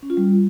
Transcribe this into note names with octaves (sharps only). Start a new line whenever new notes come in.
C#4
F4
G3